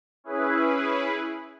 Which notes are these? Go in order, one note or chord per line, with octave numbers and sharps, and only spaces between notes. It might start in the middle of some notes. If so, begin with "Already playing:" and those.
C#4 E4 G#4 B4